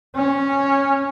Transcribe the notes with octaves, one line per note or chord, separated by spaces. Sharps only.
C#4